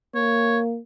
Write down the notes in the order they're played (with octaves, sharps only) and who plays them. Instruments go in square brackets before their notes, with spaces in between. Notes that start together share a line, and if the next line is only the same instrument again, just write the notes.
[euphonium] A#3 [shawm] C#5